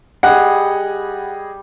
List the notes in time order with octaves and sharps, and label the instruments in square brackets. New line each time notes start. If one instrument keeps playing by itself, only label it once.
[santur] G3 [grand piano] G#4 D#5 [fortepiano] F#5